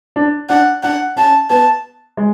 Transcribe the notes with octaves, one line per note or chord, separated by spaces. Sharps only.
D4
D4 F#5
D4 F#5
C#4 A5
B3 A5
G#3